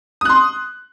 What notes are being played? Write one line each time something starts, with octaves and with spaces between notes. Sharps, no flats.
C6 D#6 F#6